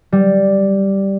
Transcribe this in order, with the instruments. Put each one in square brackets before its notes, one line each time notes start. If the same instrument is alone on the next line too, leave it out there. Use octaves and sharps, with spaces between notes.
[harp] G3